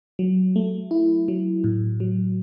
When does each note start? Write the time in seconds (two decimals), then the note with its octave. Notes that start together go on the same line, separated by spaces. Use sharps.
0.19 F#3
0.56 A3
0.91 E4
1.28 F#3
1.64 A2
2.00 F#3